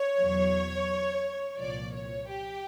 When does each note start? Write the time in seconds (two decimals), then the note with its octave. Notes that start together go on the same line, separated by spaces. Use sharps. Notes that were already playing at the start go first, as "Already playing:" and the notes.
Already playing: C#5
0.19 E2 B2 F#3
1.59 C2 A#2 F3 D5
1.94 C#5
2.29 G4